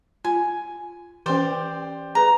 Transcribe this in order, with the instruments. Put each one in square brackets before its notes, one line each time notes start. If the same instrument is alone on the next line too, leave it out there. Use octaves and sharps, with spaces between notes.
[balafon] F4 [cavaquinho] G#5
[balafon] E3 C#4 [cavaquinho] G4 C5 D5
[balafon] G#4 B4 [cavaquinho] A#5